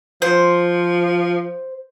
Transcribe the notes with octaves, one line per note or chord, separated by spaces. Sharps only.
F3 C5